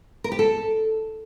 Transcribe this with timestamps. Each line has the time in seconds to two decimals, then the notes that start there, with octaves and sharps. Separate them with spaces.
0.24 A#4
0.32 G4
0.39 A4